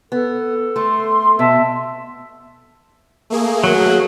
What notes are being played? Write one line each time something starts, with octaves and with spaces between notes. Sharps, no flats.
B3 A4
A3 C6
B2 E5 A5
A3 A#3 G#4
F#3